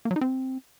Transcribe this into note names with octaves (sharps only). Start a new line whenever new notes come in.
A#3
F#3
D#4
C4